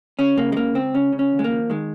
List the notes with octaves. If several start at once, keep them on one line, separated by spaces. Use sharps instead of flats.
C#3 C#4
C#3 A#3
G#3
C#2 A#3
C#2 C4
C#3 C#4
C#3
C#4
D#2
G#3
A#3
F3
D#3 G#3